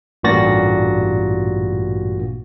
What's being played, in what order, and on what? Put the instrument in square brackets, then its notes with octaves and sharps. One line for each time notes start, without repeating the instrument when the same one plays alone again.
[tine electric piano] A1 G2 A#2 F#4 A6 A#6